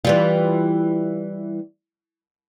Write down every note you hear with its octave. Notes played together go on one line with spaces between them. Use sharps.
E3 G3 F4